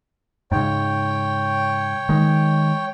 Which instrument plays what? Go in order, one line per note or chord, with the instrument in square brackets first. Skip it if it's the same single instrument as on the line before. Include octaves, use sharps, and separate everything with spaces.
[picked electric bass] G#2 C#3 [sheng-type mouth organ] C#5 G5
[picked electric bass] D#3 G#3